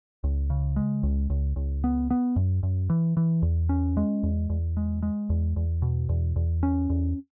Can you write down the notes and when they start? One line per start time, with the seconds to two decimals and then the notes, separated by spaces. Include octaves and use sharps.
0.24 C#2
0.50 C#3
0.76 G#3
1.03 C#2
1.30 C#2
1.56 C#2
1.84 B3
2.10 B3
2.36 F#2
2.63 F#2
2.90 E3
3.17 E3
3.42 E2
3.69 C#4
3.97 G#3
4.23 E2
4.50 E2
4.77 G#3
5.03 G#3
5.30 E2
5.56 E2
5.82 B2
6.09 E2
6.36 E2
6.63 C#4
6.90 E2